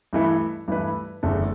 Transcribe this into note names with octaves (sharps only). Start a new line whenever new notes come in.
G2 E3 A3 E4 B4
G2 E3 A3 E4 B4
F#1 E2 D3 A3 D4